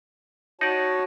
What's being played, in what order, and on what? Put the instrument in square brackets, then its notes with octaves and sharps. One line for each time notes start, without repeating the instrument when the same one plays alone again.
[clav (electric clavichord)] D#4 D5 [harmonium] F#4 C#5 A5